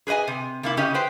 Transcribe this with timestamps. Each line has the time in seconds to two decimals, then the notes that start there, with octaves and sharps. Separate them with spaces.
0.07 G#4 B4 C5 D#5 G#5
0.27 C3
0.63 C3 A#3 E4
0.77 C#3 C#4 G4 D#5
0.94 B4 C5 G5